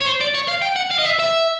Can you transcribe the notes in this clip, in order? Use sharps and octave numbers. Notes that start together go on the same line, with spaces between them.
C#5
C5
D5
C#5
F5
G5
F#5
F5
D#5
E5
E5